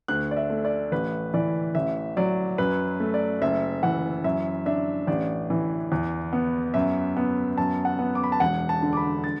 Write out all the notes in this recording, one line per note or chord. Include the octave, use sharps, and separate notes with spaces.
D2 F#6
D5
E5
A3
D5
A1 B4
E3 D5
A1 E5
F#3 D5
F#2 B4
A3
D5
F#1 E5
E3 F#5
F#2 E5
D4 E5
A1 D5
E3
E2
B3
F#2 E5
B3
F#2 A5
F#5
B3
D6
B5
A5
E1 F#5
A5
D3
D6
B5
A6